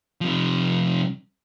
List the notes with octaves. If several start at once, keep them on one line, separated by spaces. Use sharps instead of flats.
C3 F3